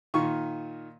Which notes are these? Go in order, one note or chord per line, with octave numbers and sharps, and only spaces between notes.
A#2 D#3 C#6